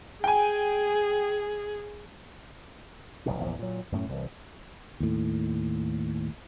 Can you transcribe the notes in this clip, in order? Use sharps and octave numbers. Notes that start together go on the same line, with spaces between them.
G#4 G5 G#5
F1 B1 E2 B2
A#1 E2 F3
A#2 F#3
F#2 A2 C#4
C2 E3
D#2 A2